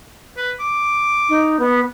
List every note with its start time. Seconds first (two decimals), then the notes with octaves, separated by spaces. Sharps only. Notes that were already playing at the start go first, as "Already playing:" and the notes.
0.37 B4
0.60 D6
1.29 D#4
1.60 B3